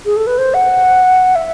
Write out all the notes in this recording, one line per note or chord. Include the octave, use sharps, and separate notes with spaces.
G#4
A4
B4
C5
F#5
E5